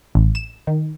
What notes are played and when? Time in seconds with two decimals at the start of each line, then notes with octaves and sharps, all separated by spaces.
0.15 A1
0.35 E7
0.67 D#3